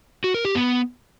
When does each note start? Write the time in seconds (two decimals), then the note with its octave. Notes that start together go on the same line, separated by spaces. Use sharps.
0.24 F#4
0.34 A#4
0.45 G4
0.55 B3